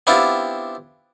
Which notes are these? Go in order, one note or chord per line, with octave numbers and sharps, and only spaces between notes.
B3 C4 D4 E4 F4 G4